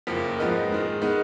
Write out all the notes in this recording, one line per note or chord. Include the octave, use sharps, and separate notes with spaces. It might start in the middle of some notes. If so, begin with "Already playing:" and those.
F#1 F2 F3 A#3
G#2 F3 B3 D#4 A#4
G#2 D#3 G#3
D#3 G#3 B3 D#4